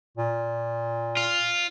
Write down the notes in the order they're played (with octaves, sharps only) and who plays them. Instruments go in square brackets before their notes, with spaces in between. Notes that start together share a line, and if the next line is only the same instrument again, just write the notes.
[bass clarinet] A#2
[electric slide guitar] F4